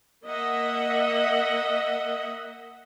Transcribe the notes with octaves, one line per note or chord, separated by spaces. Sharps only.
A#3 D#5 E5 F#5